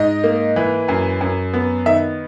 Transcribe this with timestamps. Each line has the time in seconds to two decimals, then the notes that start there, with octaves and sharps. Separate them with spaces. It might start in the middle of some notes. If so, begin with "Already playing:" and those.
Already playing: G#2 D#5
0.24 A#3
0.56 E3
0.88 F#2
1.21 F#2
1.54 B3
1.86 D#3 E5